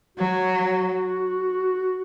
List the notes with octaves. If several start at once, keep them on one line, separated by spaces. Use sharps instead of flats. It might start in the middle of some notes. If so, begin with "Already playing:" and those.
F#3 F#4